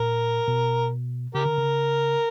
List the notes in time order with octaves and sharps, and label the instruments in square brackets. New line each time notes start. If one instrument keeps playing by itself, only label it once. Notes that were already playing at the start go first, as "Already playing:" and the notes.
Already playing: [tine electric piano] A#2 [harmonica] A#4
[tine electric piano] B2
[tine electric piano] C#3 [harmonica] G4 A#4
[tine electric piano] D3
C#3